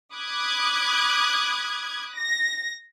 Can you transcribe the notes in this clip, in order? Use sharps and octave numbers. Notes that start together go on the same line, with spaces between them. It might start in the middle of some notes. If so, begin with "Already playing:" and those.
B5 D6 D#6 F#6 G#6
A#6